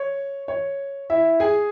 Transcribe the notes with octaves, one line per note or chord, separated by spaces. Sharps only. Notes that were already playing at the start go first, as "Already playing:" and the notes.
Already playing: C#5
C#5
E4 E5
G#4 G#5